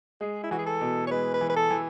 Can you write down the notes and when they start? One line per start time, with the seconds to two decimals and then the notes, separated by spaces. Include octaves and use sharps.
0.21 G#3 G#4
0.43 E4
0.51 E3 F#4
0.58 G#4
0.66 A4
0.81 B2
1.07 C#5
1.11 G#3 B4
1.34 B4
1.41 E3
1.49 B4
1.56 A4
1.71 E3